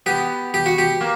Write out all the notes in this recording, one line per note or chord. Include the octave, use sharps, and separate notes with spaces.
B3 G4
G4
F#4
G4
A#3